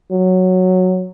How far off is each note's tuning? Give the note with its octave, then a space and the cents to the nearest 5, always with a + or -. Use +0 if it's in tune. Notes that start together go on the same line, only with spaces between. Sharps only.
F#3 -5